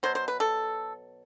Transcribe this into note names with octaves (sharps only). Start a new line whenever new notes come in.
B2 F#3 C5
C5
B4
A4